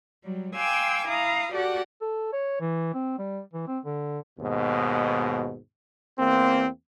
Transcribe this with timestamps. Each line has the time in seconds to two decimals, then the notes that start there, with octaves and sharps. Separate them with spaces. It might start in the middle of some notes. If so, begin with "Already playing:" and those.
0.24 F#3 G3
0.55 F5 G5 G#5 C6 D6 E6
1.08 E4 F5 A#5 D#6
1.52 F#4 G4 A4 D5 F#5
2.02 A4
2.33 C#5
2.60 E3
2.94 C4
3.19 G3
3.54 E3
3.68 C4
3.85 D3
4.40 D#2 G#2 B2
6.19 E2 A#3 C4